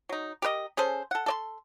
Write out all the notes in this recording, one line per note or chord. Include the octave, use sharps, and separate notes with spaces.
F#3 D#4
G4 A#4 B4 D#5
C#4 G#4 A4 C5
A4 F#5
A4 D5 C6